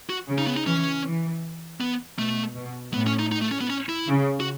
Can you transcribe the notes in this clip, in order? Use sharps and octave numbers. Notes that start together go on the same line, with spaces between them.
F#4
C#3
D#4
B3
D#4
E3 C#4
E3
B3
B2 A3
B2
A2 B3
C#4
D#4
D#4
A3
C#4
B3
C#4
E4
C#3
F#4